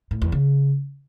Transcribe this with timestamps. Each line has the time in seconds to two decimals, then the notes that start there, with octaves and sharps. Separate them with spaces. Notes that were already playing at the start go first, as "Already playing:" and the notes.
0.11 A2
0.22 E2
0.32 C#3